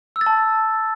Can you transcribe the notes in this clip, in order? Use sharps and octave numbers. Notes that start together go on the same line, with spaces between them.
E6
A6
A5